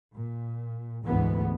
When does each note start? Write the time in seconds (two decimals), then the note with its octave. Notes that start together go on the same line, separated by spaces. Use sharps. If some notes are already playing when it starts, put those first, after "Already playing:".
0.16 A#2
1.05 F1 D2 G#2 E3 G#3 B3